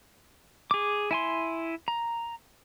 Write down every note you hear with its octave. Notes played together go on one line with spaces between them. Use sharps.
G#4 D6
E4 G#5 C6
A#5